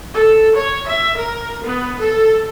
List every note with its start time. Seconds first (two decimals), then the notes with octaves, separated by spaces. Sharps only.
0.14 A4
0.56 C#5
0.87 E5
1.18 A#4
1.63 B3
2.01 A4